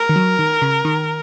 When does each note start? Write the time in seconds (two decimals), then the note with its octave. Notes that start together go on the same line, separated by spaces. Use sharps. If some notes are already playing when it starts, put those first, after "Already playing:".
Already playing: A#4
0.09 D#3
0.16 F#3
0.39 D#3
0.62 C#3
0.85 D#3